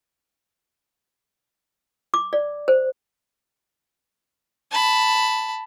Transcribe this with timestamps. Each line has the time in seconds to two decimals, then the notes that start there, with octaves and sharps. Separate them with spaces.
2.14 D6
2.33 D5
2.68 C5
4.72 A5 B5